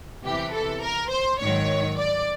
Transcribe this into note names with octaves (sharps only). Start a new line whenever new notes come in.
E2 C3 E3 G4
A4
A#4
C5
G#2 D#3 F#3 C#5
D5